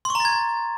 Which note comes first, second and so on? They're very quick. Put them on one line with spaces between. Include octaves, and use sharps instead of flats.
C6 C#6 A#5 A6 G#6